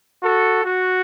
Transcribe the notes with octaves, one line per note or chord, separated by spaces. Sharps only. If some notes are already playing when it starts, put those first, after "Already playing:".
F#4 A4
F#4